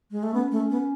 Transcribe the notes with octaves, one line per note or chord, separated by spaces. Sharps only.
G#3
A3
B3 C#4
A3
B3